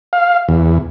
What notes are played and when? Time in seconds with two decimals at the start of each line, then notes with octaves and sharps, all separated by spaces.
0.13 F5
0.49 E2